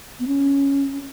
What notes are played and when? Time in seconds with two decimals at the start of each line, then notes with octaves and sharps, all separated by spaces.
0.20 B3
0.27 C#4